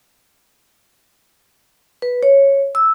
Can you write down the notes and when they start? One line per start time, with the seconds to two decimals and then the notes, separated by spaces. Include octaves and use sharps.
2.02 B4
2.23 C#5
2.75 E6